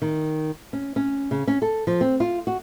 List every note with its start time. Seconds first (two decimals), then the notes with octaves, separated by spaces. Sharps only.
0.02 D#3
0.73 C#4
0.96 C#4
1.31 C#3
1.48 C#4
1.62 A4
1.87 F3
2.01 C4
2.20 F4
2.47 F#4